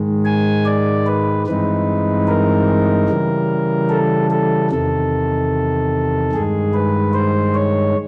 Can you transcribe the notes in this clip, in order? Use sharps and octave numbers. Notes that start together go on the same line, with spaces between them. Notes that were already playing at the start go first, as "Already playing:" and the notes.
Already playing: G#2 D#3 G#3
G#5
D5
B4
G2 E3 G#3 C4 D#4 B4
A#4
C#3 E3 G3
A4
A4
E2 C3 D#3 A4
G2 D#3 G#3 G#4
B4
C5
C#5